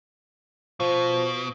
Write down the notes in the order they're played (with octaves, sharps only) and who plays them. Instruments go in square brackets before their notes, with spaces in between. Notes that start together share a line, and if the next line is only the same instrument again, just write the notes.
[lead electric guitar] B2 [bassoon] F3